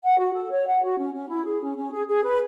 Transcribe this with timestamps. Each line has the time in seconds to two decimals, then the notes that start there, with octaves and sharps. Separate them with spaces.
0.03 F#5
0.19 F#4
0.34 A4
0.51 C#5
0.66 F#5
0.83 F#4
0.98 C#4
1.14 C#4
1.29 E4
1.45 G#4
1.61 C#4
1.76 C#4
1.92 G#4
2.07 G#4
2.24 B4